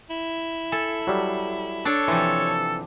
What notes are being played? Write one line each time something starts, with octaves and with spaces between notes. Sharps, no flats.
E4
A4 G#5
F#3 G3
D4 A4 C#5 D5
C3 E3 F3